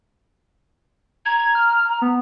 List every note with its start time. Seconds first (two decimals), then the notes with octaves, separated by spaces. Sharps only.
1.25 A#5 G#6
1.55 F6
2.02 B3